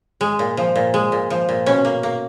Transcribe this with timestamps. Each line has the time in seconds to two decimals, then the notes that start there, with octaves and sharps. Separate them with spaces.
0.21 G#3
0.39 A#2
0.57 F3
0.76 A#2
0.94 G#3
1.12 A#2
1.30 F3
1.49 A#2
1.66 B2 C#4
1.85 A#3
2.03 A#3